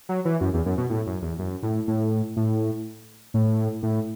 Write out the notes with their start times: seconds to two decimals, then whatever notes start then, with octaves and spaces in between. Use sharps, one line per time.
0.09 F#3
0.25 E3
0.41 F#2
0.54 E2
0.66 F#2
0.78 B2
0.90 A2
1.07 F#2
1.22 E2
1.39 F#2
1.63 A2
1.88 A2
2.36 A2
3.34 A2
3.83 A2